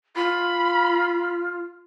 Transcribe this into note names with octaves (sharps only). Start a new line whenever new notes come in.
F4 B5